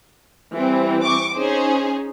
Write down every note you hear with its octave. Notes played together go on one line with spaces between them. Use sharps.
E3 G3 C4
C#6 D6
C#4 D#4 G#4 C5